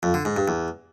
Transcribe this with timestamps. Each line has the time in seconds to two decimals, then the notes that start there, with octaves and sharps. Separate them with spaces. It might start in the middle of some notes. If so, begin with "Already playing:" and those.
0.03 F2
0.14 D3
0.25 G#2
0.36 G2
0.48 E2